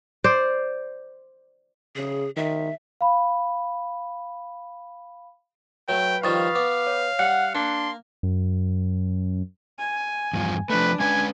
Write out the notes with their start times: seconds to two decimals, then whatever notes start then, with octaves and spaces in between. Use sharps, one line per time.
0.24 C5 D5
1.96 C#3 G#4
2.36 D#3 E5
3.01 F5 B5
5.89 F#3 A3 B4 G5
6.24 D#3 F3 G3 F5 C#6 D#6 A6
6.55 B3 D6
6.87 C#5
7.19 G3 F#5 F#6 C#7
7.55 A#3 D4 C6
8.23 F#2
9.79 G#5
10.33 E2 G2 F3
10.70 F3 A3 D4 B4
11.00 G#3 C#4 B4 G#5